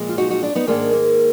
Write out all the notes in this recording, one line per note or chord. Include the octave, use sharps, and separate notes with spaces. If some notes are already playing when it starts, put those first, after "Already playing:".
Already playing: A#2 F3 G#3
F4
D#4 F#4
D#4 F#4
D4 F4
B3 D#4
G#2 D#3 G#3 A#3 D4
A#3